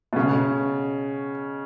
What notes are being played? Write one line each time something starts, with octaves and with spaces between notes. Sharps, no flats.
B2
C#3